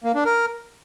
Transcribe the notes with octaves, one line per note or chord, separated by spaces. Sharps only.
A#3
D4
A#4